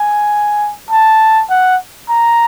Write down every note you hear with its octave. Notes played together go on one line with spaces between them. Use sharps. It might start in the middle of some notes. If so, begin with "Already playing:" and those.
Already playing: G#5
A5
F#5
A#5